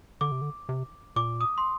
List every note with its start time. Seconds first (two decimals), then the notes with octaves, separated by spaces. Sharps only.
0.21 D3 D6
0.32 C3
0.41 D3
0.69 C3
1.16 A#2 D6
1.41 D#6
1.58 C6